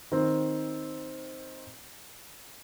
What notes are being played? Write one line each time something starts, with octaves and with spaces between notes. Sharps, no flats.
D#3 C4